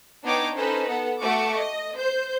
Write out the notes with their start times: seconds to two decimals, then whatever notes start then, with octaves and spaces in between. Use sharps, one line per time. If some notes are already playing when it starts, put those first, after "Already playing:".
0.24 B3 D4 D#4 C#5 G5 D6
0.55 C#4 D#4 A4 B4 C5
0.88 B3 A4 F#5
1.20 A3 F#4 F#5 C#6 D6
1.55 D#5
1.96 C5 G6